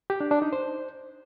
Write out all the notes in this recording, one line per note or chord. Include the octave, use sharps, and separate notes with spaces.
G4
D4
D4
D#4
C5